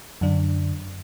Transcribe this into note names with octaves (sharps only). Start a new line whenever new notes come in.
F#2 D3 D4